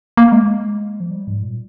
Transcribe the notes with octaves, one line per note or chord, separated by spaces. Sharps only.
A#3
G#3
F3
G3
G#2
A#2